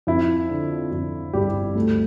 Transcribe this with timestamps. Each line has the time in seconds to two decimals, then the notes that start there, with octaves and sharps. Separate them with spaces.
0.07 F2 E4
0.50 D3
0.92 F2
1.33 G1 G3 G4
1.75 D2 A3 A4